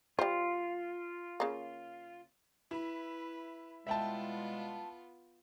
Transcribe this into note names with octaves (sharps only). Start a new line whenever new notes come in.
G3 F4 C5
C#3 A#3
E4 B4
B2 G3 G#3 B3 F4 E5 G5 A5